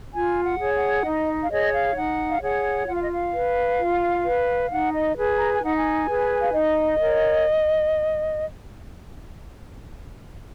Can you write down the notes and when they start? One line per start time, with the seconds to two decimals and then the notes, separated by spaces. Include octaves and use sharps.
0.14 F4 G#5
0.44 F#5
0.59 G#4 C#5
0.74 F#5
1.04 D#4 D#5
1.44 F5
1.50 G#4 C#5 D#5
1.74 F5
1.96 D#4 F#5
2.31 F5
2.43 G#4 C#5 F#5
2.88 F4 F#5
2.95 F5
3.03 D#5
3.11 F5
3.34 B4
3.79 F4
4.24 B4
4.71 D#4 F#5
4.93 D#5
5.16 G#4 B4
5.39 A#5
5.52 G#5
5.63 D#4 F#5
5.77 G#5
6.07 G#4 B4
6.43 F5
6.53 D#4 D#5
7.00 A#4 C#5